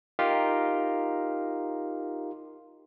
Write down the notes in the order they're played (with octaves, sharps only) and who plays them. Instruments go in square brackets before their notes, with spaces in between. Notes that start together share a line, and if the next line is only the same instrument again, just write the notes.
[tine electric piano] D#4 F4 G4 A#4 F5